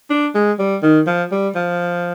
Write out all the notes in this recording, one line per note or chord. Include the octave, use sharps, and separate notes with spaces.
D4
G#3
G3
D#3
F3
G3
F3